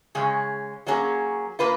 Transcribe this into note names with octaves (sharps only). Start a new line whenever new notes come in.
C#3 G#3 C#4
F#3 A#3 C#4 G#4
A#3 F4 B4